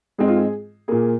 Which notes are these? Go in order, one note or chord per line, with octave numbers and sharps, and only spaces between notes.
G#2 G#3 C4 G#4
F4
G#4
A#2 A#3 G#4